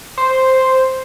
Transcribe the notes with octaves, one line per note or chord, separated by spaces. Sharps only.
C5